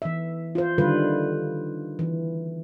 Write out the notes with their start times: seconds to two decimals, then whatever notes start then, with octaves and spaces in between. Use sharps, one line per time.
0.02 E3 E5
0.55 F4 C5
0.78 D3 D#3 G3 F4 B4
1.99 E3